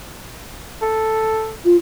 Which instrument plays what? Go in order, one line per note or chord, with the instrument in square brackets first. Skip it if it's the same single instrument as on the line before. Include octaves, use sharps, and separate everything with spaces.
[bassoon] A4
[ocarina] F4